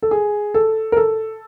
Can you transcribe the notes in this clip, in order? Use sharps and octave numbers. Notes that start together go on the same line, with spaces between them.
A4
G#4
A4
A#4
A4